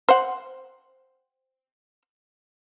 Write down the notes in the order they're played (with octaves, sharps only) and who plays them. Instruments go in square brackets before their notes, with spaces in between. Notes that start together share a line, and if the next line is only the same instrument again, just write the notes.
[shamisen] C5 F#5